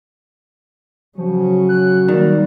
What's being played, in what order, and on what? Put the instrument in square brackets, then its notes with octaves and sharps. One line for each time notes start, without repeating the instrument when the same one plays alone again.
[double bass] C#3 C#4 [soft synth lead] F3 [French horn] F#3
[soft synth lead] F#6
[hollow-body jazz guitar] D#3 [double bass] G3 A#3 [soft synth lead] D5